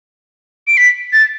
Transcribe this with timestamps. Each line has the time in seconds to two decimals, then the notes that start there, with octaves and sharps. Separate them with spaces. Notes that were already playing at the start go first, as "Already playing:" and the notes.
0.67 D7
0.77 B6
1.13 A6